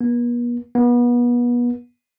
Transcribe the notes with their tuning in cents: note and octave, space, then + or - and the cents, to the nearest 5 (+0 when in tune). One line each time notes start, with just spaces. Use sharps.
B3 -45
B3 -30